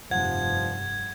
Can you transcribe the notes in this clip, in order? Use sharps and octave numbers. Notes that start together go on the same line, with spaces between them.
F1 G2 F3 F#5 G#6